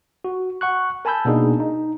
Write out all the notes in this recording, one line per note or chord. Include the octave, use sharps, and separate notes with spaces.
F#4
F#5 C#6 F#6
A#4 G#5 A5 B5 E6 G6
B2 A#3 B3 D4 D#4 G#4
D#4